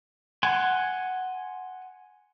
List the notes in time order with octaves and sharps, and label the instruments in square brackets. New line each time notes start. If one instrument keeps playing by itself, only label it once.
[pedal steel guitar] F#5 G#5 C6